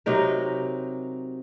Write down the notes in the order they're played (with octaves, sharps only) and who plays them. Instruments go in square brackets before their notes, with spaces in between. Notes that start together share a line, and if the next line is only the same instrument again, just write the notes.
[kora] C3 F#3 D#4 A#4